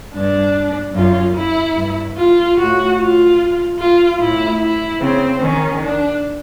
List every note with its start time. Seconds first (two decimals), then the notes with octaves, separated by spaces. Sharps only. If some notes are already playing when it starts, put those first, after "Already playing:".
0.14 G2 D4
0.95 F#2 F4
1.35 E4
1.76 G2
2.16 F4
2.57 A2 F#4
2.99 F4
3.79 F4
4.20 A2 E4
4.60 E4
5.01 C#3 C4
5.41 D#3 C#4
5.82 D4